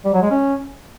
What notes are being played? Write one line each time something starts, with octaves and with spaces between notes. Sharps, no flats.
G3
F#3
G#3
C#4